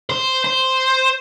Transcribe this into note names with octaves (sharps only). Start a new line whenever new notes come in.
C5
C5